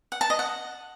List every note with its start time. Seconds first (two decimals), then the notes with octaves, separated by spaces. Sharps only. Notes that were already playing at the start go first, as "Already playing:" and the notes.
0.12 F#5
0.21 A5
0.30 D#5
0.39 F#5